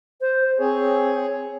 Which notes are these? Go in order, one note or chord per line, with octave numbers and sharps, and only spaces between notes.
C5
C4 G#4 C#5